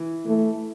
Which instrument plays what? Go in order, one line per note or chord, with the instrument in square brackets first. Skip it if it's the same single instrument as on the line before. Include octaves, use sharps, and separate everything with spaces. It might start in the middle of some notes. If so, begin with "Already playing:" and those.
Already playing: [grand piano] E3
[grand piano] E3 [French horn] A3